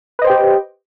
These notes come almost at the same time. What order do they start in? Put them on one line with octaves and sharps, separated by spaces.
B4 D#5 C5 G5 G4